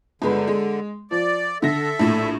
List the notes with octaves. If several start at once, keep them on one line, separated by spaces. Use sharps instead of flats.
G1 D3 G#3 B4
G#3
F3 D5
D3 A4 E5 A#6
A#1 A2